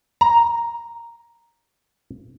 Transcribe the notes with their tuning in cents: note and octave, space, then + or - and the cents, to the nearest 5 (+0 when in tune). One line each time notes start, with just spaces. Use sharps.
A#5 +5